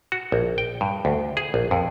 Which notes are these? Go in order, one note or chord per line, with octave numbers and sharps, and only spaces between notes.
F#4
A#1
G5
G2
D2
G#4
A#1
F2